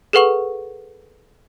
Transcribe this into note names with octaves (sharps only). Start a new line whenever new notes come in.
G#4 A4 B4 F#5 C#6 F#7